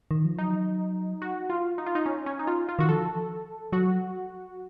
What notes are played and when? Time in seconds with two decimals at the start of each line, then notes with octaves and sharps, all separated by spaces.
0.11 D#3
0.25 F3
0.38 F#3 D#4
1.22 F#4
1.50 F4
1.78 D#4
1.86 F4
1.95 D#4
2.06 C#4
2.26 C#4
2.39 D#4
2.47 F4
2.69 F4
2.79 D#3 F#4
2.89 F3 A4
3.72 F#3 F#4